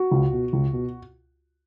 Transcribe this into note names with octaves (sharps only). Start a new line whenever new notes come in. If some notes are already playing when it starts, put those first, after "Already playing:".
Already playing: F#4
C#2
B2
C#2
B2